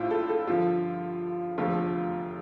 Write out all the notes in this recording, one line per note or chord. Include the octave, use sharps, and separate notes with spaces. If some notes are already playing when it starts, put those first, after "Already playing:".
Already playing: A1 A2 G3 D4 E4 F4 C5
A4
A4
G2 D3 F3 F4
F1 E2 D3 F3 A3 F4